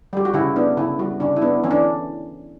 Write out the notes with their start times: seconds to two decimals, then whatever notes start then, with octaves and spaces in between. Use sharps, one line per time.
0.13 G3 G4
0.25 F#4
0.34 C#3 E4
0.56 B3 D4
0.77 C#3 E4
0.99 G3 F#4
1.20 C#3 D4
1.36 E4
1.42 B3 D4
1.64 E3 C#4
1.71 D4